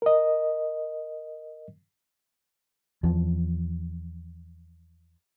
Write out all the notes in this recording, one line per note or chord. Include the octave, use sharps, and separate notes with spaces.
A#4 D#5
E2 F3